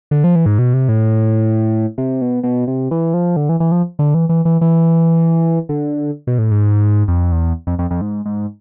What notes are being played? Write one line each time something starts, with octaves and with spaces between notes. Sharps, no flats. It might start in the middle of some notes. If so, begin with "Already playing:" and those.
D3
F3
E3
G#2
B2
C3
A2
C3
B2
B2
C3
E3
F3
D3
E3
E3
F3
D3
E3
E3
E3
E3
D3
B2
A2
G#2
F2
E2
F2
F2
F2
G#2
G#2